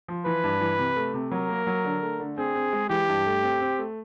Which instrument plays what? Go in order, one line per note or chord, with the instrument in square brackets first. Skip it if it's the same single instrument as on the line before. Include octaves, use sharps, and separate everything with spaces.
[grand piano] F3
[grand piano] E3 [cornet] B4
[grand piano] G2
E3
C3
A3
C3
[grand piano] F#3 [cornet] A#4
[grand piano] A#3
F#3
D3
A3
D3
[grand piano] C4 [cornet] G#4
[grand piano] C4
G#3
[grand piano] E3 [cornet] G4
[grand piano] G2
A3
C4
C4
A3